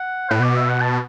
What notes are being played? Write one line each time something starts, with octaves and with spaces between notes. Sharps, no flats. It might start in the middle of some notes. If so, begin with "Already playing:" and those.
Already playing: F#5
A2 B4
B2 D5
E5
F#5
A5